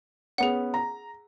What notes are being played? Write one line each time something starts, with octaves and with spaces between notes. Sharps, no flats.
B3 C#4 G#4 F#5
A#5